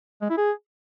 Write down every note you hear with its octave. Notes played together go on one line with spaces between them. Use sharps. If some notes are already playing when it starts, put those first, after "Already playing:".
G#3
E4
G#4